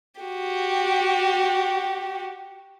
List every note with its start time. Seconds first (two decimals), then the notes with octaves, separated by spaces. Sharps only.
0.21 F#4 G4